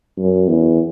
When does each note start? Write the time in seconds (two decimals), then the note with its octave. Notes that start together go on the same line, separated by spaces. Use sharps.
0.18 F#2
0.48 E2